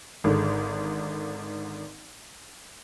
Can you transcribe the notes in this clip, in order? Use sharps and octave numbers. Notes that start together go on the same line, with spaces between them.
G#1 G#2 D3